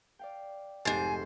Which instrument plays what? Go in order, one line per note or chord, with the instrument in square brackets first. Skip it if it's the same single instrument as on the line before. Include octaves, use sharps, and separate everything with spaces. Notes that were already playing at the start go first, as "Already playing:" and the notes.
[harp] D5 F5 G5
[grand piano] F1 A6 [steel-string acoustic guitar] G#2 C5 [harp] D#4 A4 [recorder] G#5